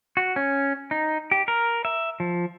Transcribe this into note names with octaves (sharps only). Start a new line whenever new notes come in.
F#4
C#4
D#4
G4
A#4
E5
F3